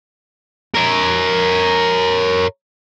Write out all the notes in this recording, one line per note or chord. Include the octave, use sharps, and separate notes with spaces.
A#4 C#5